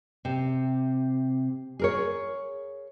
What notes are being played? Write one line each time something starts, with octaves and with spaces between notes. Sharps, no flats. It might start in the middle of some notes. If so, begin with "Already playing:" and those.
C3
G#4 A#4 C#5